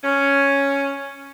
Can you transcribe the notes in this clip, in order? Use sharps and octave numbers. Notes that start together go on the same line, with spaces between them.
C#4